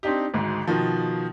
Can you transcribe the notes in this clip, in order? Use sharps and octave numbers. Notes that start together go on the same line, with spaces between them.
C4 D4 D#4 G4
G#1 D2 G#2
B2 D#3 F3